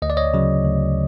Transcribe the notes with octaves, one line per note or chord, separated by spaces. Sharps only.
D2 D#5
D5
C#5 D#5
C#3 F#3
D2